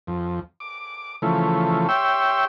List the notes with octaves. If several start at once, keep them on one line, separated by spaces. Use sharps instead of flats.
F2
D6
C#3 E3 F3 A3
G4 C#5 E5 G5 C6 E6